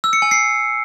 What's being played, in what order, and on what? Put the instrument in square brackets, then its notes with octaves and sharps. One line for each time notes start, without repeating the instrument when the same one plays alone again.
[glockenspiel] E6
C#7
G#5
C7